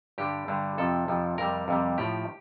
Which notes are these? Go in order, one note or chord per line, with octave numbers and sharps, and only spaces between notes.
G2 D3 G3 G4
G2 D3 G3
F2 C3 F3 A4
F2 C3 F3
F2 C3 G3 A#4
F2 C3 G3
A2 F3 G4